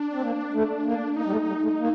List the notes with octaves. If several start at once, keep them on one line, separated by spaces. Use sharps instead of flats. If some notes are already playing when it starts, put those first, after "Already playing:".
Already playing: D4
C4
A#3
A3
A#3
A#3 D#4
G3
A3
G3
A3
A#3